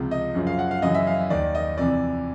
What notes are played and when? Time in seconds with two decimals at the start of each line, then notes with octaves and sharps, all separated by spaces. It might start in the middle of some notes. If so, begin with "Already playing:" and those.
Already playing: C#2 C3 F3
0.11 D#5
0.35 F#2 C#3 F3
0.47 F5
0.59 F#5
0.71 F5
0.82 F#2 C#3 E3 D#5
0.95 E5
1.07 F5
1.30 D#2 D#3 D5
1.55 D#5
1.78 F2 C3 E3 D5